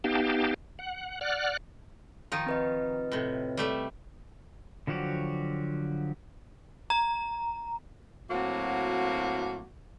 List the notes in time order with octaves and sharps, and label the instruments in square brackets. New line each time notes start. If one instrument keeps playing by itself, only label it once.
[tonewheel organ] B3 D#4 G4 F5 G5 A5
F#5
D5 F#5 F6 F#6
[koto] D#3 F3 D#4
[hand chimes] C4 B4 D#5
[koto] A2 C3
G3 A3 E5
[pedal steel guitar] D3 F3 F#3 F#4 G4
[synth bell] A#5
[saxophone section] A2 F#3 A#3 C4 F#4